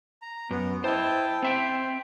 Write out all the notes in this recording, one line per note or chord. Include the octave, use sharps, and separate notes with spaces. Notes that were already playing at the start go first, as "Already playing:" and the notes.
A#5
F#2 B3
E4 C5 D#5 G5 A5
C4 C5 E5 G5